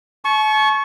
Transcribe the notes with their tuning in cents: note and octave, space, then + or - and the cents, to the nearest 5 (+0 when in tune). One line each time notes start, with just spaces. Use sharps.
A5 -40 C#6 +0